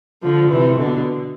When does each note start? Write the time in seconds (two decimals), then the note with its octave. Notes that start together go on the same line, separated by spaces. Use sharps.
0.23 D3 F3
0.50 C3 E3
0.78 B2 D3